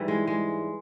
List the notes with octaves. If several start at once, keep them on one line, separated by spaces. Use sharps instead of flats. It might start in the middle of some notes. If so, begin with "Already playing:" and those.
Already playing: G#2 E3 G3
G#3
G#3